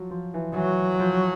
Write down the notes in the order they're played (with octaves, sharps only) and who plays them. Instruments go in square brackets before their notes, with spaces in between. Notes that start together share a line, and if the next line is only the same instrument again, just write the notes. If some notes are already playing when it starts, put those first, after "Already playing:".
Already playing: [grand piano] F3 F#3
F3
E3
[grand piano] E3 [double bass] F#3
[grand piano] F3